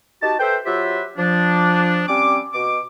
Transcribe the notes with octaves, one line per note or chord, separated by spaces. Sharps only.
D#4 F#4 G4 A5
A4 B4 C5 E5 G5
F#3 F4 G4 B4 C5 E5
F3 D4
G3 C4 C#4 D6
B2 D6